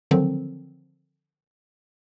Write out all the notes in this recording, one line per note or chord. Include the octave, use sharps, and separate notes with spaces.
D3 D#3 F3 F#3 C4